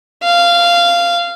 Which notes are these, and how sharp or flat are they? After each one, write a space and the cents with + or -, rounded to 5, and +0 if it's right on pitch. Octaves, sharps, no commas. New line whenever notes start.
F5 -15